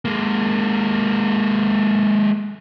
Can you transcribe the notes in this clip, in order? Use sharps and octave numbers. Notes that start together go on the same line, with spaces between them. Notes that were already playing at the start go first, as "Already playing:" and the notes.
G#3 A#3